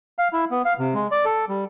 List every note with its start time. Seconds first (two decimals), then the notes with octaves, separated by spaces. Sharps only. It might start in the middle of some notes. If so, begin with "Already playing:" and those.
0.18 F5
0.33 E4
0.51 B3
0.65 F5
0.79 C3
0.94 G#3
1.11 D5
1.25 A4
1.49 G3